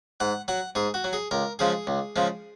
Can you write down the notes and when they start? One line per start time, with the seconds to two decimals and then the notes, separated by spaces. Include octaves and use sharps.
0.20 G#2 F#5
0.48 F#3 F#5
0.75 G#2 G#4
0.94 F#4
1.04 F#3
1.13 G#4
1.31 C#2 A#4
1.59 C#3 F3 G#3 G#4
1.87 C#2
2.16 C#3 F3 G#3